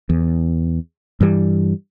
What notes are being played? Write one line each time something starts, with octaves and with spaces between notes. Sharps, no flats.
E2
G2 E3 G3